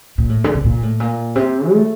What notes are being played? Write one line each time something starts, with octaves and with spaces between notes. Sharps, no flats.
A#2
A2
D3
C3
A#2
A2
A#2
C3
A3